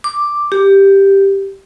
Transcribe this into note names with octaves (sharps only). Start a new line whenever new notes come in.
D6
G4